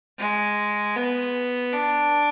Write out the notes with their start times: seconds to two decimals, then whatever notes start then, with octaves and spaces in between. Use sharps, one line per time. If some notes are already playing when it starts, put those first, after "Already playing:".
0.19 G#3
0.96 B3
1.73 D4